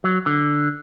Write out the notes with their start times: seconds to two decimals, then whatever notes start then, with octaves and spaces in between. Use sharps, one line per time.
0.04 F#3
0.26 D3